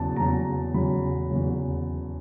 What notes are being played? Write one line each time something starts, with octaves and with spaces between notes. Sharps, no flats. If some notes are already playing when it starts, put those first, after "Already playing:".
Already playing: E2 C#3 F#3 A5
E2 C#3 F#3 A#5
E2 C#3 F#3 B5
E2 C#3 F#3